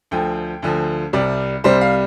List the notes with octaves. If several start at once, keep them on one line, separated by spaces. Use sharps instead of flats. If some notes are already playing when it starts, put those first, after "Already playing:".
D2 D3 F3 G5
D2 D3 F3
C2 C3 G3 D5
C2 C3 G3 C5
F5